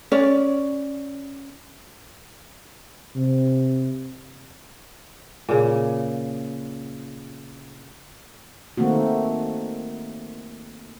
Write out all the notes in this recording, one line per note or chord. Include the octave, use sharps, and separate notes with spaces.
C#4 D5
C3
A#2 C#3
D#3 A3 A#3 C4 F#4